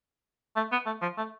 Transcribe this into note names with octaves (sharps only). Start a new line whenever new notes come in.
A3
B3
A3
F3
A3